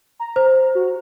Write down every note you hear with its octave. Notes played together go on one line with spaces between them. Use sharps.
A#5
C5
F#4